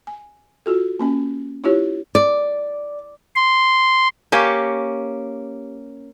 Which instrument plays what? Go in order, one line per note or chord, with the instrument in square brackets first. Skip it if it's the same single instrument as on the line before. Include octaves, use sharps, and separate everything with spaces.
[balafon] G#5
F4 F#4 A4
A#3 C#4 G#5
D4 E4 F4 G4 C#5
[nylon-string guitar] D5
[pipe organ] C6
[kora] A#3 C#4 G4 C#5